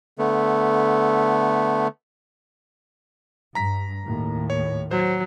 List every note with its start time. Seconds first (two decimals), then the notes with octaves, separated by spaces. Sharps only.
0.18 D3 A3 B3
3.55 G2 A#5 B6
4.04 D#2 A2
4.50 C#5
4.91 F#3 C5